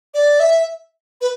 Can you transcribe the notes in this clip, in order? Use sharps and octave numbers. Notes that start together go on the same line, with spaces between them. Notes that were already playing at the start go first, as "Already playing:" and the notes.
D5
E5
B4